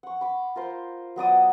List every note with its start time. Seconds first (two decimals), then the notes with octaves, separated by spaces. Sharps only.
0.03 F#5 C#6
0.21 B5 D6
0.56 F4 A#4 C5
1.16 F#3 B3 D5 D#6